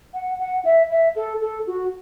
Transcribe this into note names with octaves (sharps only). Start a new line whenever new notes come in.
F#5
F#5
E5
E5
A4
A4
F#4